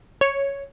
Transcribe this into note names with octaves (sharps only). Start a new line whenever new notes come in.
C#5